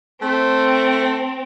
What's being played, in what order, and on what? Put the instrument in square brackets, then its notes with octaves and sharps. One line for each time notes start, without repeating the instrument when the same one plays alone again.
[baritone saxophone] A3 [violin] C4